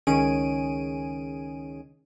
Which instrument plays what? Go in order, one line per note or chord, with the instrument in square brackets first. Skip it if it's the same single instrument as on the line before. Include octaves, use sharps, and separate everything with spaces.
[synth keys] C#2 D#3 C#4 G#4 D7 D#7